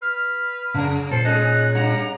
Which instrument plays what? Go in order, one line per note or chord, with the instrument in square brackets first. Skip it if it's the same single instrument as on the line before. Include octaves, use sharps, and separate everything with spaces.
[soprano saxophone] B4 [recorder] F6
[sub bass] F#2 [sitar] C#3 A#4
[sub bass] A#2 [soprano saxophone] A4 [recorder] C5
[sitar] G#3 C#4 [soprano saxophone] D#4 [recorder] F#6
[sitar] G2 [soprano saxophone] F#5 [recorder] A#5